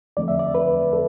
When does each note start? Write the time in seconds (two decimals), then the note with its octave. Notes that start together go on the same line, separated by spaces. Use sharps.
0.17 E2 D3 F3 A3 C4 D5
0.28 E5
0.39 D5
0.55 B4
0.93 A4